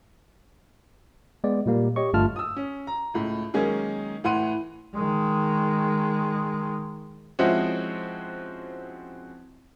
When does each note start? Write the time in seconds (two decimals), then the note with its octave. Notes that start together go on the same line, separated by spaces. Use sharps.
1.44 G#3 B3 D5
1.66 A#2 G3 A#3
1.96 G4 C#5 D#5 C#6
2.13 G1 G2 A3 F4 A5 F6
2.36 D#6 E6
2.56 C#4
2.87 A#5
3.14 C#2 A2
3.54 D#3 F#3 G#3 A#3 C#4 G#4
4.24 A2 E3 F#5 C6 D#7
4.95 D#3 G#3
7.39 F3 G#3 C4 C#4 E4 F#4